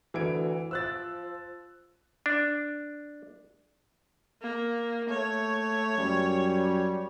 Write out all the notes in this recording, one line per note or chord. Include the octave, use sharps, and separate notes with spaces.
D2 E3 G#6 D7
F3 E6 F#6 A6
D4
A#3
A3 C#5
F#2 G3